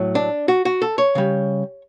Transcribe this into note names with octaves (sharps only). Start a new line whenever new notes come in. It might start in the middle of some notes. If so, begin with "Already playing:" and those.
Already playing: A2 F#3
D4
F#4
F#4
A4
C#5
C#3 G3